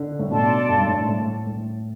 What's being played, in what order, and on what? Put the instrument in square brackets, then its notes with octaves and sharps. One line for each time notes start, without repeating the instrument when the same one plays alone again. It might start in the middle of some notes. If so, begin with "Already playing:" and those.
Already playing: [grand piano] D3
A2
[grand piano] B2 [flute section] A4 D5 A5 C6
[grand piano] G2
G2
A2
A2
A2